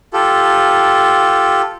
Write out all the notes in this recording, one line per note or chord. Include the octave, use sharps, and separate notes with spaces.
F4 G4 A4